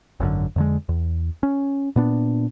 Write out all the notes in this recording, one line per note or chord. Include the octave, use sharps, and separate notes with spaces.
G#1 F#2 A2 D3
F2 D3 G#3
E2
C#4
A#2 B3 D4